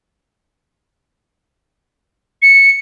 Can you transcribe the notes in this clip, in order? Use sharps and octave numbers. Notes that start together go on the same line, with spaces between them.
C#7